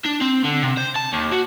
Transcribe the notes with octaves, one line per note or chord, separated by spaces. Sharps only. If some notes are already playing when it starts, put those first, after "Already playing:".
D4
C4
D3
C3
C5
A5
D#2
F#4